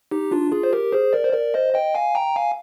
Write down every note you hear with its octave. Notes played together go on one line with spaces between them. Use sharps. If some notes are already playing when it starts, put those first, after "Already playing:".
D#4 G4
D4 F4
F4 G#4
C5
G4 A#4
G#4 C5
A#4 D5
C5
A#4 D5
C5 D#5
D#5 G5
F5 G#5
G5 A#5
F5 G#5